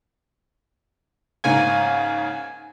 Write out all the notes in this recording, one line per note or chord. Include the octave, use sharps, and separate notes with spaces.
G#2 C#3 A#3 G#5